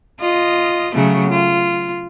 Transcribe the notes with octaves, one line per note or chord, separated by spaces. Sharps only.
F4 D#5
C#3 F#3 A3
F4